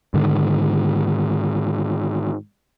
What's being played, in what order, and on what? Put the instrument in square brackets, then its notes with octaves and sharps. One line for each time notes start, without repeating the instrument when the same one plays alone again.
[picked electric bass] G#2 D3 D#3